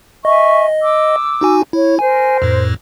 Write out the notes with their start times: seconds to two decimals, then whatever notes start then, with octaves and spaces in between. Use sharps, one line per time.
0.25 D#5 E5 G#5 C#6
0.81 D6 E6
1.41 D#4 F#4 G#5
1.73 E4 C#5
1.99 A#4 C5 G#5
2.42 F2 A2